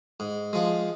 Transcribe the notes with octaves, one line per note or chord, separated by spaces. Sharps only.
G#2
F3 G#3